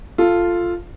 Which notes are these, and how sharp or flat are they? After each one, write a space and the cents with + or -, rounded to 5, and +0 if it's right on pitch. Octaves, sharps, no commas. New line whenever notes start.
F4 -5 A4 +0